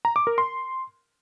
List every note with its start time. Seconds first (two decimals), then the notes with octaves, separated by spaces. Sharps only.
0.05 A#5
0.16 D6
0.27 A#4
0.38 C6